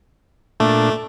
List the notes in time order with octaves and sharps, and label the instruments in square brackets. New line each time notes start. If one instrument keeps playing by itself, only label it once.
[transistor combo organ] A#2 D4 [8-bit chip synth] A3